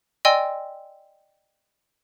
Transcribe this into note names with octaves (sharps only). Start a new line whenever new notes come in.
D5 D#5 G5 G#5 C6 E6